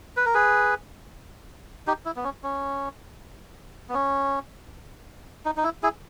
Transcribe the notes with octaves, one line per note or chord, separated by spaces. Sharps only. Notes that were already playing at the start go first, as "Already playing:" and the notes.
B4
A#4
G#4 B4
D#4 G4
E4
B3
C#4
C#4
B3
C#4
D#4
D#4
E4
E4 G#4